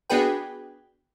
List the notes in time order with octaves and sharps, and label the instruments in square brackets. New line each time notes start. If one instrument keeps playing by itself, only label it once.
[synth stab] B3 D4 F#4 G#4 B4 G5